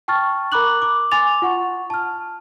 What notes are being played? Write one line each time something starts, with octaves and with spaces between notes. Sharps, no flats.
G5 A5 C#6 F6 A6
A#4 A#5 B5 D6 F#6 F#7
D6
G#5 C6 D6 A6 F7
F4 F#5 C#6
A5 F6